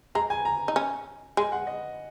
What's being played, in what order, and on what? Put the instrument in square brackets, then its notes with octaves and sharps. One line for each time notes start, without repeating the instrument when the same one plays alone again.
[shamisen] G#3 [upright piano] A#5
[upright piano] G#5
A#5
[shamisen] D#4
C#4
[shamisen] G#3 [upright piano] G#5
[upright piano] F#5
D#5